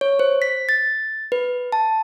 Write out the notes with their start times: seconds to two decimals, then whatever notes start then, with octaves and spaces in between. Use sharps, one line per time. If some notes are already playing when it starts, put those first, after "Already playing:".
0.01 C#5
0.19 C5
0.42 B6
0.69 A6
1.32 B4
1.72 A5